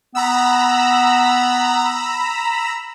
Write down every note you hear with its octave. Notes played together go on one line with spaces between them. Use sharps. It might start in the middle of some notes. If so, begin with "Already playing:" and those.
B3 A#5 B5 E6